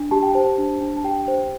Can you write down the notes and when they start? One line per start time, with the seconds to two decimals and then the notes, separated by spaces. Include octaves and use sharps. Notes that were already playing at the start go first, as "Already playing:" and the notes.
Already playing: D4
0.11 G4 A5
0.23 G5
0.34 C5 A5
0.58 D4
0.81 D4
0.96 A5
1.04 G4 G5
1.28 C5